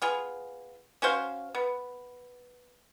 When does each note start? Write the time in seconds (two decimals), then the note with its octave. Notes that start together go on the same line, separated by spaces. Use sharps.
0.02 B3 F4 G#4
1.02 C#4 F#4 C5 F5
1.55 B3